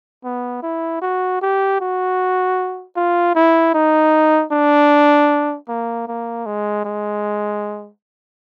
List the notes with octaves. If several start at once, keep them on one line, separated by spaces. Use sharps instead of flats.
B3
E4
F#4
G4
F#4
F4
E4
D#4
D4
A#3
A#3
G#3
G#3